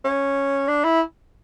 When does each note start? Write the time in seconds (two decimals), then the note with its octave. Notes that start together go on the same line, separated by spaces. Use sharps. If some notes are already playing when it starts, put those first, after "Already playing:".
0.04 C#4
0.68 D4
0.84 E4